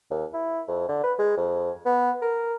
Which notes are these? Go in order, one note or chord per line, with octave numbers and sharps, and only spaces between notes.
D#2
E4
F2
D3
B4
G#3
F2
B3
A#4